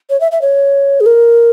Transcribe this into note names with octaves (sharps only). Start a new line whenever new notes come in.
C#5
E5
E5
C#5
G#4
A#4